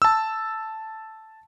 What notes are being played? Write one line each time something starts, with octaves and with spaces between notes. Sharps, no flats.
A5 E6